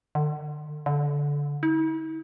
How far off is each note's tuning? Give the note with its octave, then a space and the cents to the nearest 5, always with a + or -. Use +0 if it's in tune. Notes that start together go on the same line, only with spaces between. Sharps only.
D3 +35
D3 -20
E4 -45